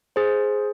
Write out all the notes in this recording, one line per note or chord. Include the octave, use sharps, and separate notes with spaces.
G#4 C5